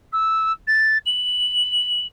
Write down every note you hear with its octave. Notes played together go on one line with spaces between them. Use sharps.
E6
A6
F#7